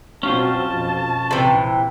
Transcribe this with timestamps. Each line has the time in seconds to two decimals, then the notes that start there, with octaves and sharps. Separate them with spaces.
0.23 B2 F#3 C4 C#4 F4 C5 A5
0.65 F2 B2
1.31 A#1 C3 E3